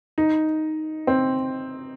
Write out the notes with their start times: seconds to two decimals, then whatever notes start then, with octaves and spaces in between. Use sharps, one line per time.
0.18 D#4
1.07 C4